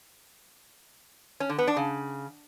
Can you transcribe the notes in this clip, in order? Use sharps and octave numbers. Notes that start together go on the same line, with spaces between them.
C#4
D3
B3
D4
C#3